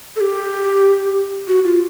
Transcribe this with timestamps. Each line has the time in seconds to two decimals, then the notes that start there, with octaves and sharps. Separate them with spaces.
0.16 A4
0.21 G4
1.48 F#4
1.64 F4